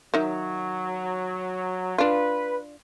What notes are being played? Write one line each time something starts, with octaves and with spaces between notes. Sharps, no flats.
D#3 F#3 D#4 E5
D4 F4 B4